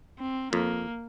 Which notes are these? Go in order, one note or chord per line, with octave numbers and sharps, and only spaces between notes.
C4
F2 A#3